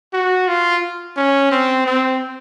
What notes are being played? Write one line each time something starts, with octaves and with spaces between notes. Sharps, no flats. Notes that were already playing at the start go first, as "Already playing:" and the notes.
F#4
F4
C#4
C4
C4